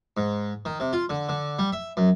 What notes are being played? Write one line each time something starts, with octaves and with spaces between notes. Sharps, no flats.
G#2
D#3
C3
F4
D3
D3
G3
E5
F#2